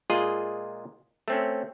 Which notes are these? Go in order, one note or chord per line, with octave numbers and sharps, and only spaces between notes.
A#2 G#3 F4 G#4 D#5
A3 C4 C#4